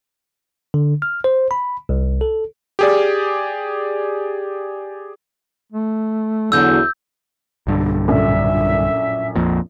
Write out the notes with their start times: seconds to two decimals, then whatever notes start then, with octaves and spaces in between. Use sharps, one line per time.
0.74 D3
1.02 F6
1.24 C5
1.51 B5
1.89 C2
2.21 A4
2.79 G4 G#4 D5
5.72 A3
6.52 E2 D3 F#3 E6 G6
7.67 B1 G2 D3
8.08 A#1 F#2 A2 E5
9.36 A#1 F2 A#2